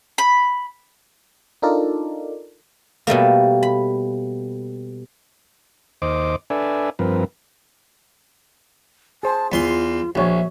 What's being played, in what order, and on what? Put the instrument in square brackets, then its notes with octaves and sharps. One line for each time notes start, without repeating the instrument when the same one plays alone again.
[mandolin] B5
[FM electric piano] D4 D#4 F4 A4 A#4 D5
[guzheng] B2 G3 A3 A#3
B5
[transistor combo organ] D#2 C5 D#5 D6
D4 A4 B4 D5 E5 G#5
G2 F3 C4 A#4 B4
[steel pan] G#4 C5 [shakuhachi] A5
[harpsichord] E2 C6 [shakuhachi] F4
[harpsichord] A#1 [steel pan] F#4 C#5 [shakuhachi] E5